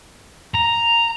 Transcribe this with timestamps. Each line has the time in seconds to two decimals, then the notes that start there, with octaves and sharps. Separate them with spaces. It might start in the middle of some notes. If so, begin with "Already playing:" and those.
0.55 A#5